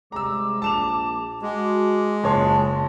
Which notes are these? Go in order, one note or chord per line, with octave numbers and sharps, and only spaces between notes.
C3 G3 G#3 A#5 D6 E6
A#1 A5 E7 F7
G#3 F#4 D6
F#1 F4 C#5 A5 C6